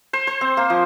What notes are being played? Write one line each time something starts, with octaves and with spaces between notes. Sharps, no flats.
C5
C5
C4
A#3
F3